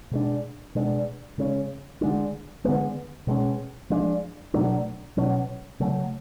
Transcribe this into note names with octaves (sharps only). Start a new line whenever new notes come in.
B2 G#3 D4
B2 G#3 D4
C#3 G#3 C#4
D3 G#3 D4
D3 F3 G#3 B3
B2 G#3 C#4
F3 G#3 D4
B2 F#3 A3 D4
B2 F#3 C#4
C#3 F#3 A3